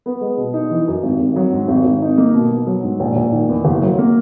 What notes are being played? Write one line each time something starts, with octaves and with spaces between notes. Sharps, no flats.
B3
G#3
B2
D#4
E3
F#2
G#1
G#1
F#3
G#2
G#1
G#1
D#4
A#3
B2
B2
F#3
G#2
A#1
A#1
D#3
E2
F#1
F#3
A#3